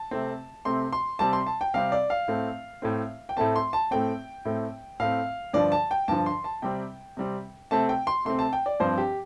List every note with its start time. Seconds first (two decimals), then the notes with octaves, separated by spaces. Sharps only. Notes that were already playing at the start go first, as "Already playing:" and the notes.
Already playing: A5
0.11 C3 A3 C4
0.65 C3 A3 C4 C6
0.93 C6
1.19 C3 G3 C4 A5
1.33 C6
1.47 A5
1.61 G5
1.74 C3 G3 C4 F5
1.92 D5
2.10 F5
2.28 A2 A3 C4
2.82 A2 A3 C4
3.29 G5
3.37 A2 A3 C4 A5
3.56 C6
3.73 A5
3.91 A2 A3 C4 G5
4.45 A2 A3 C4
5.00 A2 A3 C4 F5
5.53 G2 D3 F3 D5
5.72 A5
5.91 G5
6.08 G2 D3 F3 A5
6.26 C6
6.44 A5
6.62 C3 G3 C4 G5
7.17 C3 G3 C4
7.71 C3 A3 C4 A5
7.89 G5
8.07 C6
8.25 C3 A3 C4 C6
8.39 A5
8.53 G5
8.66 D5
8.80 G2 F3 C4 C5
8.98 G4